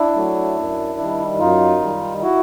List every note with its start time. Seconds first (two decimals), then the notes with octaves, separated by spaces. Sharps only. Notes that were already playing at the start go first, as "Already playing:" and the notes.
Already playing: D4 E4
0.15 F#3 A3
0.57 F#2
0.99 D#3 G3
1.39 F#2 D#4 F4
1.81 D#3 G3
2.22 E4 F#4